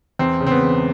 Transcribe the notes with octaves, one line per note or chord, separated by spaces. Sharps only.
E2 C4
C#3
C4
B3
E1